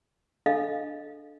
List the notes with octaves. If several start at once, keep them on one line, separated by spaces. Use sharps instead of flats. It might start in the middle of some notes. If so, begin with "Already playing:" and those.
D4 A4 D#5 F5